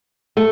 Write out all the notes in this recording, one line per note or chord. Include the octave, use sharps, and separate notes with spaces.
A3